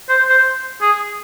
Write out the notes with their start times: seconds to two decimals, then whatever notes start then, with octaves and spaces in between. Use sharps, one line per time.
0.09 C5
0.29 C5
0.82 G#4